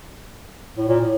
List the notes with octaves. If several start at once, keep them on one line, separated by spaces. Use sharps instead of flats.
A2
A#2
A2